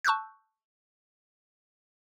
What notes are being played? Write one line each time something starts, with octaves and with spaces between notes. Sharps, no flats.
A5 C#6 E6 F#6 G6